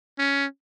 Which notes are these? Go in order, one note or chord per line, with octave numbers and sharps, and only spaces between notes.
C#4